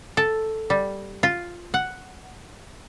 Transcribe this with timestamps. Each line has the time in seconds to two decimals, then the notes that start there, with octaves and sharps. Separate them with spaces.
0.17 A4
0.70 G3
1.23 F4
1.74 F#5